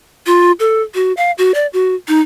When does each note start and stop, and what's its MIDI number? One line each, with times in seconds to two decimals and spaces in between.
0.26 0.52 65
0.59 0.82 69
0.94 1.12 66
1.17 1.31 77
1.38 1.52 66
1.54 1.66 74
1.73 1.95 66
2.08 2.20 63